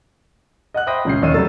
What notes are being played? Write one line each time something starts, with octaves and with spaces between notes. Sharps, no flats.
D#5 F#5 F#6
C5 E5 G5 B5 D#6 A#6
D#1 C#2 C#4 G6 C7
E1 D#2 D#4 C#5 E6 D#7
C3 F#3 G3 A3 E6 A6